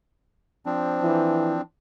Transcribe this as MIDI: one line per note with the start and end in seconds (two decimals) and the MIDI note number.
0.66 1.61 53
0.66 1.61 60
0.66 1.61 62
1.02 1.59 52